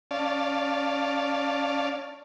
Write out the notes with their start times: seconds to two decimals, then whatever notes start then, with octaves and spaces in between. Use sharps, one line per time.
0.11 C#4 D5 F5 A5